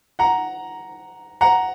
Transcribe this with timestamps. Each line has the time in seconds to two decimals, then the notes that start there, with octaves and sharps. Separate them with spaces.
0.19 F#5 A#5
1.41 F#5 A#5